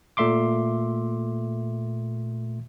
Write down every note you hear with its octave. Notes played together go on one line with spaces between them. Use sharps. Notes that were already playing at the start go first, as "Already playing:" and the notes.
A#2 A3 E5 C6 D6